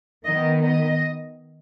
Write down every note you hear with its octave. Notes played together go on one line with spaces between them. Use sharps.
D#3 B3 D#5
D#5